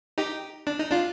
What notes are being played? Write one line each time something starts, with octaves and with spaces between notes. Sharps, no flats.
D#4 G4
D4
D#4
D4 F4